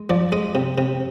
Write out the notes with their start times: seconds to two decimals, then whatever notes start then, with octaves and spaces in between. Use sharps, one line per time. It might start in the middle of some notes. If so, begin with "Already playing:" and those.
Already playing: G#3
0.10 F3 D5
0.32 G#3 D#5
0.55 C3
0.78 C3